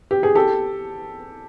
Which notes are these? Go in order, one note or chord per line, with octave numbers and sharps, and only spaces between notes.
G4
G#4
G4 A4